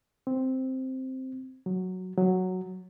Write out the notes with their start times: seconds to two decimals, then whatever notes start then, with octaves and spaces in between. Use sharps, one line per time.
0.27 C4
1.66 F#3
2.17 F#3